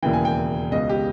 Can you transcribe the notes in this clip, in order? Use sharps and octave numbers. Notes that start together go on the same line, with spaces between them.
E1 D#2 C#3 E3 G5
G#5
G5
C#2 B2 D#5
G4